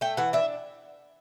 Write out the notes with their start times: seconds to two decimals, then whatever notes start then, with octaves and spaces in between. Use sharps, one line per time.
0.01 A3 G5
0.17 E3 F#5
0.33 D4 E5